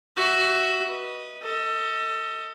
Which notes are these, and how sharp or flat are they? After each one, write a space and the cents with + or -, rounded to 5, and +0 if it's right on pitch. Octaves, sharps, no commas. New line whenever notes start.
F#4 +15 E5 +0
B4 -20 D#5 +0
A4 +30 D#5 +35